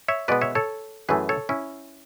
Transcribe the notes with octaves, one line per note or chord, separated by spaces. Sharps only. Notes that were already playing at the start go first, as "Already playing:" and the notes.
C#5 E5
B2 G#3 B3 B4 D5
C#5 E5
A4 C#5
F#2 E3 A3 G#4 B4
A4 C#5
C#4 E4